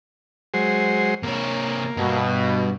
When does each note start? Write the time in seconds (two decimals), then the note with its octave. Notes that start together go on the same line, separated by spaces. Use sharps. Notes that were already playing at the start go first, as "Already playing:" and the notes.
0.54 F#3 G#3 C5
1.23 C3 A#3 C#5
1.97 G2 B2